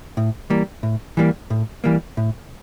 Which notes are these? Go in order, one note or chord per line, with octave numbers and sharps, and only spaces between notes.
A2
E3 G3 A#3
A2
E3 G3 A#3
A2
E3 G3 A#3
A2